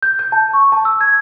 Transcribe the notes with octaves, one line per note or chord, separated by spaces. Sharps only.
G6
G6
A5
C#6
A5
E6
G#6